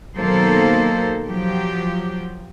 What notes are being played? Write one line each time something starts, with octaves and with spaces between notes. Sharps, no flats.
B2 D#3 F#3 A#3 A4 C5
F3 F#3 G4